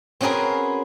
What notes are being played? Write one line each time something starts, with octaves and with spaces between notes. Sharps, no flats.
C4 C#4 F#4 G#4 A#4 B4